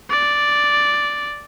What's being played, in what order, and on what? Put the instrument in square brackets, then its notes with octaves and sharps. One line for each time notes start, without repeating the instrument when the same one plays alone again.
[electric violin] D5